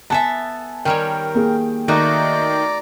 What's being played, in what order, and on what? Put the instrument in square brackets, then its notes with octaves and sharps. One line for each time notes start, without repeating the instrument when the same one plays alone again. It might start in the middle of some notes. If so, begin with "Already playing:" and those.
[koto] B3 A4 E5 [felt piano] G#5 A5
[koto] D#3 G3 C#5 [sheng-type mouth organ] A#4 [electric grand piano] G5
[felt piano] A#3 G#4
[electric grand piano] D#3 D#5 [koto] A3 D#4 F#4 [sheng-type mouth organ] D5 A#5 D6